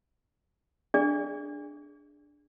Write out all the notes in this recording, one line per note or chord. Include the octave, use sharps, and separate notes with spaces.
D4 G#4 D5